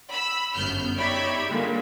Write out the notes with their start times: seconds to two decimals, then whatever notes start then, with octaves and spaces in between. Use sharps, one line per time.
0.10 B5 E6
0.55 G1 F#2 B3 F6 G6
0.97 D#4 G4 C#5 D5 E5 B5
1.47 A#2 D3 G3 G#3